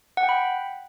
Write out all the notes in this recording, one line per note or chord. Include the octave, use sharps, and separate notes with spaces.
F#5
G5
B5